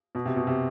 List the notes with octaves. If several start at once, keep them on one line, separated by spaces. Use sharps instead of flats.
B2
C3
B2
C3